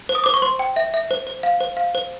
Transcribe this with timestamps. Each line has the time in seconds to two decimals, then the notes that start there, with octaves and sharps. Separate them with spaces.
0.09 C5
0.15 D#6
0.24 C5 D6
0.34 C#6
0.42 C5 C6
0.59 G5
0.76 E5
0.94 E5
1.11 C5
1.27 C5
1.43 F5
1.60 C5
1.77 F5
1.95 C5